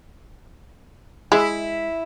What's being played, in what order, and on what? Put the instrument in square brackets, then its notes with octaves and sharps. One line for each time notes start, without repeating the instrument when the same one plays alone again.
[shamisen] G#3 [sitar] E4